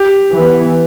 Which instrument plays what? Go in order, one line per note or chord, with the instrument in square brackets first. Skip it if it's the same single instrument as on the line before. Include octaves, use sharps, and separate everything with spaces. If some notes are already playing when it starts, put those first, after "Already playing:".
Already playing: [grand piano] G4
[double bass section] E3 B3